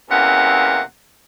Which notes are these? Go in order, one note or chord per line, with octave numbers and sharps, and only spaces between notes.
E2 C3 A#3 C#4 F#5